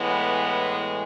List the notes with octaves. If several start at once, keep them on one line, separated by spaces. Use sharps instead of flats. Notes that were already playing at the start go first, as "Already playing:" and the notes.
Already playing: A2 E3 G#3 B3